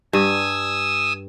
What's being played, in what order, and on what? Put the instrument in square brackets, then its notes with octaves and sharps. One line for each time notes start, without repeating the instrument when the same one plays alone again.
[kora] G2 [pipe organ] G#5 D#6 E6